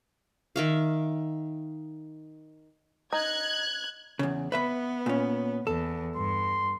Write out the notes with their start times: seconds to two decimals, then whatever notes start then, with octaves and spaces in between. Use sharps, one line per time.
0.56 D#3 E5 F5
3.13 D#4 F#6 G#6
4.19 E2 C#3
4.52 B3 B4 E5 B5
5.06 A#2 C#4
5.67 E2 A4
6.16 G2 C6